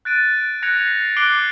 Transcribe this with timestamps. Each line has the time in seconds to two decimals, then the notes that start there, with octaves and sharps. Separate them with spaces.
0.05 F#6 A6 D7 D#7
0.62 F#6 G#6 A#6 C#7 F7
0.87 C7
1.16 D6 F#6 C7 D7 F#7 G7